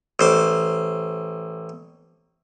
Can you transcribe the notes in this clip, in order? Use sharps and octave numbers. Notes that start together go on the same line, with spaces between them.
A1 C5 D6